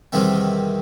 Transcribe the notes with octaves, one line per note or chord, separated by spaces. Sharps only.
E2 C3 D#3 G3 C4